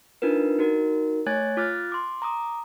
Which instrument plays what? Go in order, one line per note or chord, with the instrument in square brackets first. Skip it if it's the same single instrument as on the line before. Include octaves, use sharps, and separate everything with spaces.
[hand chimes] D4 D#4 F4 A#4 B4
D#4 F#4 A#4
A3 C#5 G#5 F#6 G#6 A6
F4 D6 F6 F#6 A6
C6 D6
A#5 D6 D#6